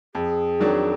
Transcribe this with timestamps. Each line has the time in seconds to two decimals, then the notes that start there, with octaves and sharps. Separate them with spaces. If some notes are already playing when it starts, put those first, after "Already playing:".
0.15 F2 G#4
0.60 D#3 F#3 D4